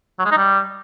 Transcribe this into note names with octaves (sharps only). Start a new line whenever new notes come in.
F#3
G#3
D#4
G3